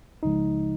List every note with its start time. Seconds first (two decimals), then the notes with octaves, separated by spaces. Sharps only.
0.23 C#2 C#3 F3 G#3 D#4